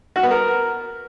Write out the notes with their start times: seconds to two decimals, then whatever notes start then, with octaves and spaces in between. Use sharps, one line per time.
0.16 F#4
0.23 B3
0.31 A#4